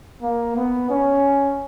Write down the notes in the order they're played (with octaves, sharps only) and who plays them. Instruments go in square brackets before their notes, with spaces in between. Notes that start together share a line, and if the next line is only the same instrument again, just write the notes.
[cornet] A#3
B3
C#4